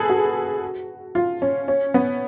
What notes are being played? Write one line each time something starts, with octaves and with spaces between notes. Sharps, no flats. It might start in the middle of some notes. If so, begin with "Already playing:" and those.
Already playing: G#4 A4 B4
F#4
F4
C#4
C#4
B3